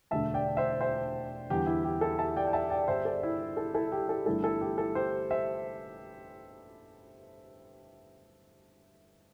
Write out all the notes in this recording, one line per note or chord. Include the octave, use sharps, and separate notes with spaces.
E1 D2 D3 A3 E5 A5
D5 G5
C5 E5
C5 E5
E2 D3 G3 G4
E4
G4
E4 A4
E5 A5
D5 G5
G5
E5 A5
D5 G5
G1 G2 G3 C5 E5
A4 D5
E4
E4 A4
E4 A4
G4
E4 A4
G1 G2 E3 A3 E4 A4
E4 A4
G4
E4 A4
G4 C5
C5 E5